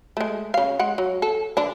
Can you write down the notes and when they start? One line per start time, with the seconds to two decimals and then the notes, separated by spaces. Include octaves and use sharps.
0.17 G#3 A3
0.54 C#3 F5
0.79 G#3 F#5
0.98 F#3
1.22 A4
1.57 D3 D4